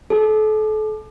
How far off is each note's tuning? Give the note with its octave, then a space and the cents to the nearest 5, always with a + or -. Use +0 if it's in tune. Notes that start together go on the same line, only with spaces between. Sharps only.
A4 -35